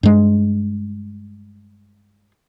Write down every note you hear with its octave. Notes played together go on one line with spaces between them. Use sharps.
G2 G#3